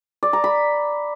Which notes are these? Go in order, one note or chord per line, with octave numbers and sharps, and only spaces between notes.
D5
A#5
B5